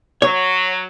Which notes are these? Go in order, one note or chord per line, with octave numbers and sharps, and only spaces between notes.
F#3 C#5